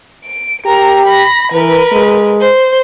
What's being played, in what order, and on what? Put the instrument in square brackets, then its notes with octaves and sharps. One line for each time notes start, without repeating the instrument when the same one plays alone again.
[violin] D7
[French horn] G4 [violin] A#4 A#5
[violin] B5 A#6
[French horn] E3 [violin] A#4 B4
[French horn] G#3
[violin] C5